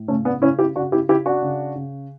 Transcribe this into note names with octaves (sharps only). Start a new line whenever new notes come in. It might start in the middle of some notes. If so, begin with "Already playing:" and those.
Already playing: A2
C#3 A3 C#4
B3 D4
C#3 C#4 E4
E4 G4
C#3 D4 F#4
E4 G4
C#3 E4 G4
D4 F#4
C#3
C#3